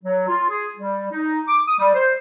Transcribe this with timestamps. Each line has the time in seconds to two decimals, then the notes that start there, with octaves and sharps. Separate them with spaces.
0.04 F#3
0.28 F4
0.49 G#4
0.77 G3
1.11 D#4
1.48 D6
1.67 D#6
1.79 G3
1.94 C5